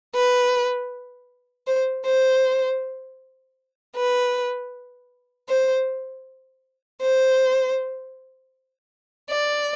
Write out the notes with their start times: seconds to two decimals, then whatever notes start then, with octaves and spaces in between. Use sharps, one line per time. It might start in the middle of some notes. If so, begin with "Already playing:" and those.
0.15 B4
1.67 C5
2.06 C5
3.96 B4
5.49 C5
7.02 C5
9.30 D5